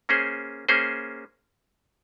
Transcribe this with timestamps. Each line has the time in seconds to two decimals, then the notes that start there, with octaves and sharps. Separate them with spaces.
0.09 A#3 C#4 G#4 C5
0.69 A#3 C#4 G#4 C5